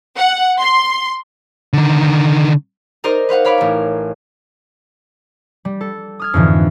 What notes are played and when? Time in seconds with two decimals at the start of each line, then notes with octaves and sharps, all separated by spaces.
0.16 F#5
0.60 C6
1.73 D3 D#3
3.04 D#4 A#4 C5 D5 D#5
3.29 B4 C5 F5 F#5
3.45 C#5 F5 B5 D6
3.58 A1 A#4
5.65 G3
5.81 A4
6.20 D#6 F6 G#6
6.34 F2 G#2 D3 E3